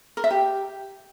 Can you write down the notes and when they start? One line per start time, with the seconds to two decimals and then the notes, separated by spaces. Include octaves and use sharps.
0.17 A#4
0.24 E5
0.31 G4